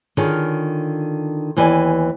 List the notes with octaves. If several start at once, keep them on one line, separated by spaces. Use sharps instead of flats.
D3 D#3 F4 G#4 C#5
D#2 E3 B3 G4 D5 G#5